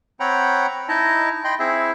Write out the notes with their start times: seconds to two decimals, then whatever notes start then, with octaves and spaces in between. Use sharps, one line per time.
0.20 C4 C#5 F#5 G5 A#5 B5
0.89 D#4 E4 D#5 A5
1.44 D#5 G5 B5 C6
1.59 C4 E4 G#4 E5